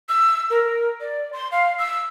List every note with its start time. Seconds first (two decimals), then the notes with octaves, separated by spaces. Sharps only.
0.09 E6
0.50 A#4
1.01 D5
1.33 C6
1.52 F5
1.79 E6